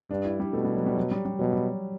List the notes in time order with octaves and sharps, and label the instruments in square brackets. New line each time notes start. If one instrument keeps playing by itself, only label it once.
[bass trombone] G2 [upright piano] D4
[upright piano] E4
G3
[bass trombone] B2 [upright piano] A3
[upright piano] G3
F#3
G3
F#3
G3
G3
[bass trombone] B2 [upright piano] F#3
[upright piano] G3